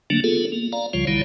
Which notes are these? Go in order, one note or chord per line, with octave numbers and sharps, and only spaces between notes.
D3 F#3 A3 A#3 D4
B3 F4 G#4 A4
A#3
D5 F5 A#5
C#2 C#3 F3 G3 F4 C#5
B1 D3 D#3 G3 E4 C#5